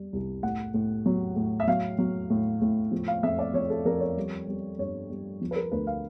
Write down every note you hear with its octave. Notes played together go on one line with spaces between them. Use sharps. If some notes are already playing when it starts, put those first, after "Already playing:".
Already playing: G3
C2
A2 F#5
A2
F#3
A2
E5
F#3 F5
F#3
A2
A2
F3
F5
F2 E5
D5
F2 C#5
A4
F2 A#4
C#5
G3
G3
G2 C#5
G3
F3
B4
A#4
D2 B4
F5